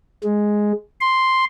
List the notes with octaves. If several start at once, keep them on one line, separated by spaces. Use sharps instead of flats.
G#3
C6